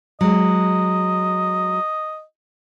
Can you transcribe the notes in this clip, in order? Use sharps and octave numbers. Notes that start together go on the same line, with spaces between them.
F#3 G#3 D#5